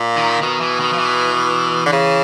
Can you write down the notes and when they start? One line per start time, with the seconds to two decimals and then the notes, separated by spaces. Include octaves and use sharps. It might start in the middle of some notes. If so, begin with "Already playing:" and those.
Already playing: A#2
0.16 D#3
0.41 B2 D#3
0.61 E3
0.80 D#3
0.93 F3
0.98 E3
1.86 D3
1.92 C#3